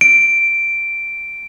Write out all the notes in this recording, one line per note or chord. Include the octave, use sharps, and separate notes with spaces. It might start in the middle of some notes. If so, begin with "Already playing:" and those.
D7